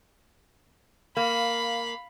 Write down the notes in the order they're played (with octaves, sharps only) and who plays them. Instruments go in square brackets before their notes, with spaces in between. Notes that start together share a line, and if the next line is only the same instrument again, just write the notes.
[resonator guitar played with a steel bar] A#3 [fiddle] F5 B5